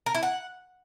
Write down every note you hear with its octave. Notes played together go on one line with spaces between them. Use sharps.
A#4
E4
F#5